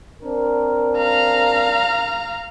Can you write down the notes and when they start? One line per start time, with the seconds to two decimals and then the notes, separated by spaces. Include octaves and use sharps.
0.23 C4 D4 A#4
0.98 F5 A#5